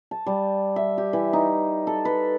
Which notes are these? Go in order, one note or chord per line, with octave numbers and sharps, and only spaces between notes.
A5
G3
E5
G4
E3
D#4
A4
B4